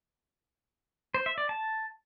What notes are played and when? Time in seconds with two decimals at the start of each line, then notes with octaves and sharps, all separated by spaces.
1.14 C5
1.26 E5
1.38 D5
1.49 A5